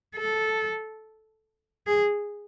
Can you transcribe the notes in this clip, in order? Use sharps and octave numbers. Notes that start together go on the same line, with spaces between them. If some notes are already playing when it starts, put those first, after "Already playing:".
A4
G#4